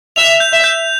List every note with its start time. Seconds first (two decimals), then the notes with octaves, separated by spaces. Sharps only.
0.16 E5 F7
0.40 G6
0.52 E5
0.64 G6